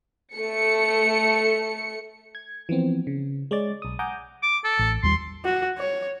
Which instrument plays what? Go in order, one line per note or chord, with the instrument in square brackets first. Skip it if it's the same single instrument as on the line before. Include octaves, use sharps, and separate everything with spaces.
[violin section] A3 C#7
[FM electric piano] G#6
E3 F3 B3 C4
C#3
G#3 C#5 D5 D6 A6
B1 D#6
F#5 G#5 A#5 D6 D#6 G6
[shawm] D6
A4
[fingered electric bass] A1
[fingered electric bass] D#2 G3 [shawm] C6
[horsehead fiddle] F#4
C#5